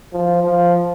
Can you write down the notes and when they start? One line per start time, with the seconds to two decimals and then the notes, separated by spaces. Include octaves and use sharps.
0.13 F3
0.43 F3